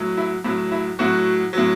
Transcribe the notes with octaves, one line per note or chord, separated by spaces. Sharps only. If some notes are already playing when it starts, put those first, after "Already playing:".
Already playing: A2 F#3
E4
A2 F#3 E4
E4
A2 F#3 F#4
A2 F#3